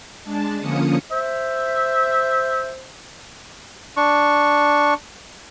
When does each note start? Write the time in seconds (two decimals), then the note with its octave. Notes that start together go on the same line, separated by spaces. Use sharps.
0.24 G#3 D4 A5
0.60 D3 F3 A#3 C#4 D#6 C#7
1.11 C5 E5
3.97 D4 C#6